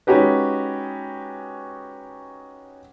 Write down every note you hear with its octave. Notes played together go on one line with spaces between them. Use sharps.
G#3 C#4 D#4 F#4 G4 B4